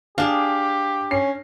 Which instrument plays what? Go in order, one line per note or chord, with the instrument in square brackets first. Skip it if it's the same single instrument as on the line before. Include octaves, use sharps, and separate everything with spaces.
[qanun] D4 G#4 [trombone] G4 [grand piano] F5
[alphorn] C#4 [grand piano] C7